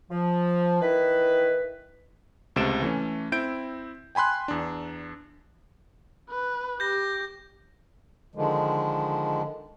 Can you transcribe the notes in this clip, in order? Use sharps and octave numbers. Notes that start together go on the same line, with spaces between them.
F3
D#3 E3 E4 B4
C#2 C3 A3 D7 E7
E3 A3 C#4
C4 E4 G6 D7
G5 G#5 B5 C6 F#6
E2 D4
B4
G4 G6 A#6
D3 D#3 F3 G#3